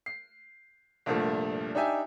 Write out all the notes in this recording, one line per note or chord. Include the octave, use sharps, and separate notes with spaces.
C7
C2 G2 A#2 F3 A3
D4 D#4 G4 E5 G#5